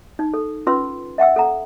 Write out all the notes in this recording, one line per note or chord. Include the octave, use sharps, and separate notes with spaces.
D#4
A4
C#4 F4 B4 C6 E6
E5 F#5 G5 E6
A4 F#5 A#5